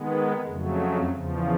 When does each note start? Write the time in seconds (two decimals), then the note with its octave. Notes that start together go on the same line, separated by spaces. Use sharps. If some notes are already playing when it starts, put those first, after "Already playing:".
Already playing: D#3 G#3 B3
0.46 F2 C#3 F#3 A3
1.10 E2 C#3 F3